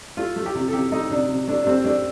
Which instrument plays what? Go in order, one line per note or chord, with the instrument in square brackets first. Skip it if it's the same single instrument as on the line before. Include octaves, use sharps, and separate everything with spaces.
[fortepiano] A3 F4
A3
G4
C3
A4
C3 G4
A3 D#4
C3 D4
C3
A3 D4
D4
A3 C4
A3 D4